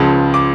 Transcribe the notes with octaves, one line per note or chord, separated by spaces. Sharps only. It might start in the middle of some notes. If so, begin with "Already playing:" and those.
Already playing: C#2 C#3 F3 A5
D6